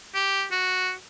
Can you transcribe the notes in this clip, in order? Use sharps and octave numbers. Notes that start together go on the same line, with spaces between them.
G4
F#4